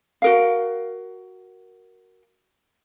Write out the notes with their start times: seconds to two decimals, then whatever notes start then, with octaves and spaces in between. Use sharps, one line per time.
0.22 F#4 A#4 F5